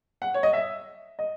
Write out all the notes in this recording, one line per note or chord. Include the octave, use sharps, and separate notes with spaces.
F#5
C#5
D#5
E5
D#5